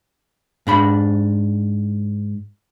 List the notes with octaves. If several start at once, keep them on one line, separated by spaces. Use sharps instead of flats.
G#2 D4 B5